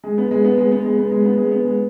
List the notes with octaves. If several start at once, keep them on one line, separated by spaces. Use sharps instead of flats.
G#3
B3
G#3
B3
G#3
B3
G#3
B3
G#3
B3
G#3
B3
G#3